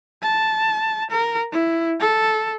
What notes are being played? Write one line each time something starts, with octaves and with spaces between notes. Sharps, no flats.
A5
A#4
E4
A4